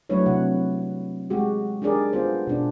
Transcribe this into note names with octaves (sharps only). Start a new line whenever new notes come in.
F#3 A3 D4 E4 B4 C#5
C3 F#5
G#3 F#4 G4
D4 D#4 G4 G#4 A#4 D5
B3 F4 C5
B2 D4